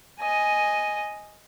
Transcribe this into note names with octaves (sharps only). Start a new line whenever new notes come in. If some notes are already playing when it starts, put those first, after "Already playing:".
D#5 G#5